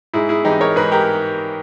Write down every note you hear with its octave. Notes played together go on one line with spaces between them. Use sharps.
G#2 E4 G#4
E4 G#4
E3 G#3 D#4 G4
A#4 C#5
G#2 G#4 B4
G4 A#4